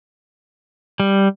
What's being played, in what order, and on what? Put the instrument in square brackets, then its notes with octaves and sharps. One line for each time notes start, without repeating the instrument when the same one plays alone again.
[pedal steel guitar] G3